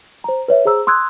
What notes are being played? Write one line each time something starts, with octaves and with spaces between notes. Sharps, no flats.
C5 A#5
B4 C#5 E5
G#4 C5 A#5 E6
C6 D#6 E6 F#6 G#6